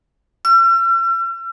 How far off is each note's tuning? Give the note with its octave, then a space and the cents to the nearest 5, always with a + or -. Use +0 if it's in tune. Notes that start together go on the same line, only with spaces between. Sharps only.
E6 +45